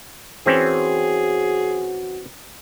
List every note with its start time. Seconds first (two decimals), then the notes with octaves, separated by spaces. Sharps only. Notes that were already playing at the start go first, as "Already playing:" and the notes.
0.46 E3 C4 C#4 F#4 G#4